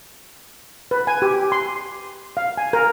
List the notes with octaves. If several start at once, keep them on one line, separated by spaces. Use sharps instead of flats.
B4
G#5
G4
C6
F5
G#5
A#4